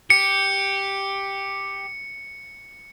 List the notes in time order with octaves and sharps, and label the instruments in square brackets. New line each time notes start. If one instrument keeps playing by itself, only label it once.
[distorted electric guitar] G4 [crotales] C#7